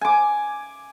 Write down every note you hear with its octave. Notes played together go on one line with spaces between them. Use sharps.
G#5 D6